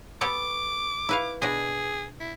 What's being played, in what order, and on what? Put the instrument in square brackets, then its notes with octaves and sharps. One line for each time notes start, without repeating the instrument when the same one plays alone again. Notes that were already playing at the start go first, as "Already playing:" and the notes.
[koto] B3 G4 A4 [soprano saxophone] D6
[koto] E4 B4 F5
[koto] B2 D4 D#5 [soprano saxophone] G#4
[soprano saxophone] E4